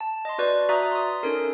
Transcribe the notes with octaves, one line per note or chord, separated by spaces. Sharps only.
A5
D#5 C6
F#4 B4 D5
F#4 E5 A#5 D#6 F#6 A6
C6 D#6
C#4 D#4 A4 A#4